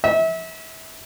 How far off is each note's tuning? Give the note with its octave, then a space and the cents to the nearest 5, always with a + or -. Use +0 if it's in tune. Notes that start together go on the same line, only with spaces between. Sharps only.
E5 -30